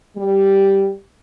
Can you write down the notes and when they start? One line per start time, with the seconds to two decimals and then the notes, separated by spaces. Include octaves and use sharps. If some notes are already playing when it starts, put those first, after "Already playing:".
0.16 G3